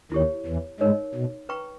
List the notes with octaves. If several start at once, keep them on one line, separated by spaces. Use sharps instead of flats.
D#2 D#3 E4 G4 C#5
E2 E3
G#2 G#3 D#4 A#4 C#5
B2
B4 G5 A#5 C#6